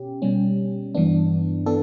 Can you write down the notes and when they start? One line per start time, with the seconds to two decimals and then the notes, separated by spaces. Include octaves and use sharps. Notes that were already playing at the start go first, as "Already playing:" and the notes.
Already playing: B2 C#4 G4
0.22 B2 G3 C#4
0.95 G2 E3 B3 D4
1.66 E3 B3 D4 A4